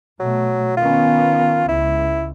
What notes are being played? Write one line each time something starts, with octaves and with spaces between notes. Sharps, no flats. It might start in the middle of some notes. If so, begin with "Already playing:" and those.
B2 F#3 A3
D#3 B3 C#4 F4
C#2 E4